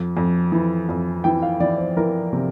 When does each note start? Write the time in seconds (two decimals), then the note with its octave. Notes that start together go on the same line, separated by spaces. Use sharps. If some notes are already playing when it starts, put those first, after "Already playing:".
Already playing: F2
0.17 F2
0.52 E3
0.89 F2
1.24 E3 G5
1.43 F5
1.60 E3 D5
1.78 C5
1.97 E3 A#4
2.33 C3